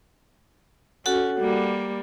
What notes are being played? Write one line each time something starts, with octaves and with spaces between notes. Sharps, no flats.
C#4 F#4 A4 F#5
G3 A#3